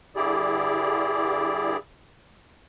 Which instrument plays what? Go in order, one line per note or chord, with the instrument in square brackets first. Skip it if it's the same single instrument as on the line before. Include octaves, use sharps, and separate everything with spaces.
[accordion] G2 D3 E4 G4 G#4 D5